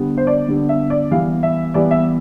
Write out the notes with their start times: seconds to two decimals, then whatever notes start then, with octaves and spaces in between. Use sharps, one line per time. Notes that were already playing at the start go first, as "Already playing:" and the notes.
Already playing: D3 G3 B3
0.18 C5
0.27 D5
0.48 D3 G3 B3
0.69 E5
0.90 D5
1.11 E3 G3 B3 F5
1.43 E5
1.74 E3 G3 B3 D5
1.91 E5